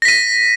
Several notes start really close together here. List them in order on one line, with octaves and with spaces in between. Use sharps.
A#6 B6 D#7